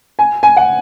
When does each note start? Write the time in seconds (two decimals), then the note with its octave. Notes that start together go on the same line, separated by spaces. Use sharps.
0.19 G#5
0.43 G#5
0.57 F#5